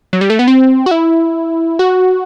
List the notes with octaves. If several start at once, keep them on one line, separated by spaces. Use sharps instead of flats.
F#3
G3
A3
B3
C4
F#4
E4
F#4